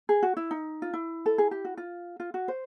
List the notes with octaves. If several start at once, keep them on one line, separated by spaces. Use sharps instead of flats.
G#4
F#4
E4
D#4
F4
E4
A4
G#4
G4
F#4
F4
F4
F#4
C5